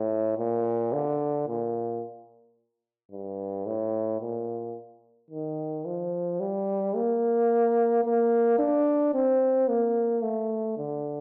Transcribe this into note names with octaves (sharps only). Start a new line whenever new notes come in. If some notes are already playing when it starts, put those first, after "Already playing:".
Already playing: A2
A#2
D3
A#2
G2
A2
A#2
D#3
F3
G3
A#3
A#3
D4
C4
A#3
A3
D3